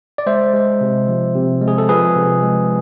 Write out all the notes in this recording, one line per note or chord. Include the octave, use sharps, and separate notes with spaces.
D5
G#3 C5 E5
G#3
C3
F3
C3
G#3
G#4
A4
F3 G#4 B4
C3
G#3